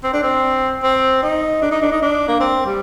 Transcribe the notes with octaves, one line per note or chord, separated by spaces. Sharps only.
C4
D4
C4
C4
D#4
D4
D#4
D4
D#4
D4
A#3
C4
G3